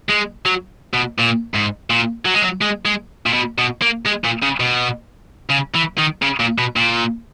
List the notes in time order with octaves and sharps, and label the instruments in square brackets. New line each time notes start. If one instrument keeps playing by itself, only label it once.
[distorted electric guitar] G#3
F#3
B2
A#2
G#2
A#2
F#3
G#3
F#3
G#3
G#3
A#2
B2
B2
A#3
G#3
A#2
C#3
B2
C#3
E3
D#3
C#3
A#2
B2
A#2